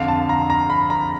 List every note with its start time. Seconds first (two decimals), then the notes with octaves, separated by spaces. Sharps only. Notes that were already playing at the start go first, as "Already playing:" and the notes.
Already playing: F2 D3 F5
0.08 A5
0.29 A#5
0.50 A#5
0.70 B5
0.90 A#5